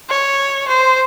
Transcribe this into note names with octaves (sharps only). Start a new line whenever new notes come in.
C#5
C5